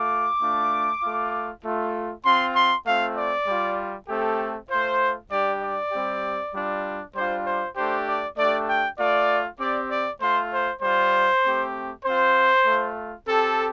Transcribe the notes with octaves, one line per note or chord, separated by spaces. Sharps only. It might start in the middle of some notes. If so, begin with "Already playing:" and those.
Already playing: A3 F4 D6
A3 D4 F4
A3 F4
A3 F4
C4 F4 C6
C6
A3 C4 F4 F5
D5
G3 F4
A3 C4 G4 A4
A3 F4 C5
G3 D4 G4 D5
D5
G3 C4 G4
G3 D4 F4
G3 D4 F4 C5
C5
A3 D4 G4 C5
D5
A3 D4 G4 D5
G5
A3 F4 D5
C4 G4 D5
D5
A3 F4 C5
C5
G3 F4 C5
A3 C4 G4
C4 F4 C5
A3 F4
C4 G4 A4